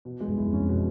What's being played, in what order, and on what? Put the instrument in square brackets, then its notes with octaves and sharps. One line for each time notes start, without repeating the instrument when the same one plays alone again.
[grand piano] B2
G#3
[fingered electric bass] G2
[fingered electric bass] F#2 [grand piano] E4
[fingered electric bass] F2 [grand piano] C#4
[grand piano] B2